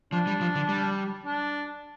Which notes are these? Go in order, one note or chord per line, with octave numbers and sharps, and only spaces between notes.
F3 D4
G3
F3
D3
G3
D4